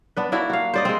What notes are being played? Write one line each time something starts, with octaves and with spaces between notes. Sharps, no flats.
B3 D4 B4
A#3 D4 E4 F#4
F#4 F5
C5 D5 D#5
G#3 C4